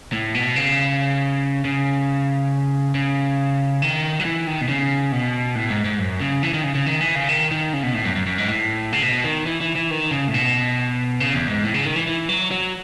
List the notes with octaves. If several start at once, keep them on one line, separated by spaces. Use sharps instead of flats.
A2
B2
C#3
C#3
C#3
D#3
F#3
E3
D#3
B2
C#3
B2
A2
G#2
G#2
F#2
C#3
E3
D#3
C#3
C#3
D#3
E3
C#3
D#3
D#3
C#3
B2
A2
F#2
F#2
F#2
G#2
A2
C#3
B2
D#3
E3
E3
E3
D#3
C#3
A2
B2
C#3
E2
G#2
A2
C#3
D#3
E3
E3
F#3
F#3